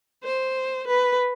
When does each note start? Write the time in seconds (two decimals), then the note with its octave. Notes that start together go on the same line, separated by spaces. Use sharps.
0.24 C5
0.88 B4